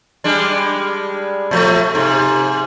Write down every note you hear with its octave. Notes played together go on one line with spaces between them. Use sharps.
G3 G#3 D4
A#2 F3 A3
G#2 C3